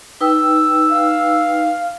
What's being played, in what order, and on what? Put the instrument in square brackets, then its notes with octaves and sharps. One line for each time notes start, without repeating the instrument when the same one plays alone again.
[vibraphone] D#4 B4 G5 [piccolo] E6
[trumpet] F5